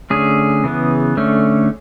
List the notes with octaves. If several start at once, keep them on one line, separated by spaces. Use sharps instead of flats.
D3 A3 C#4 G#4
C#3 E3 B3
D3 A3 C#4